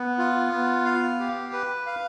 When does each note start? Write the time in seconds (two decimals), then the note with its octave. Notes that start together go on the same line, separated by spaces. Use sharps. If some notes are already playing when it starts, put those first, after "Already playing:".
Already playing: B3
0.18 F4
0.53 B3
0.85 F5
1.20 G4
1.53 B4
1.86 F5